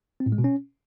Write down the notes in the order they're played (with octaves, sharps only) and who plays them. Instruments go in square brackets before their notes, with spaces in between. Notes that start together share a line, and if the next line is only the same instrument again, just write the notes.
[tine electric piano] C4
A2
G#3
B2
C#4